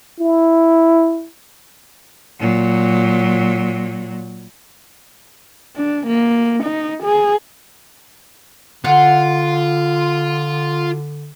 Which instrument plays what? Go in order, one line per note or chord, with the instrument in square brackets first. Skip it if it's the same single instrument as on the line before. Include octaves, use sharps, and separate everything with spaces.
[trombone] E4
[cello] A#2 F#3
[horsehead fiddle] D4
A#3
D#4
G#4
[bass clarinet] D3 [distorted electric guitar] F4 [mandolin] F#5